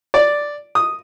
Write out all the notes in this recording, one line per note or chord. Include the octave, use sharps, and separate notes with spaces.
D5
D#6